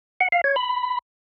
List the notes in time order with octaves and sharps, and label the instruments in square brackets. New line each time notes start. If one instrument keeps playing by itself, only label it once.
[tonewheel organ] F#5
F5
C#5
B5